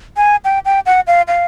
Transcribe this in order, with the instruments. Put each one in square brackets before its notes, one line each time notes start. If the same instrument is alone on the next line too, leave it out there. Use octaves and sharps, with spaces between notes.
[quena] G#5
G5
G5
F#5
F5
F5